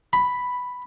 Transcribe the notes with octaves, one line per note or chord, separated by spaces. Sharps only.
B5